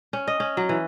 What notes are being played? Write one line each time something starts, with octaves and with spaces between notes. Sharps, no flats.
C#4
D#5
C#4
F#3
E3